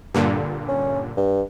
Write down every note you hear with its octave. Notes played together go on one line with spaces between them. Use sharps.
G2 A#2 D3
C#4
G2